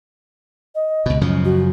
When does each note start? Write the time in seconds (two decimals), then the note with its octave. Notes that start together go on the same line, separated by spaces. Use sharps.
0.75 D#5
1.06 C#2 B2
1.21 F#2 C#3 F3
1.45 F#4